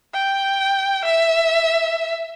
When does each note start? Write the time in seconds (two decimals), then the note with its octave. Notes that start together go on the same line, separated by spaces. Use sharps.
0.14 G5
1.05 E5